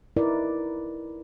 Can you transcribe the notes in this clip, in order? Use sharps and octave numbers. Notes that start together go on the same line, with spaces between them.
D#4 E4 A#4 B4 D5